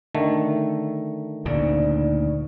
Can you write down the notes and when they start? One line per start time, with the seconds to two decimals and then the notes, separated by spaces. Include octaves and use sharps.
0.15 D3 D#3 A3
1.45 D2 A#2 C#3 D#4 D5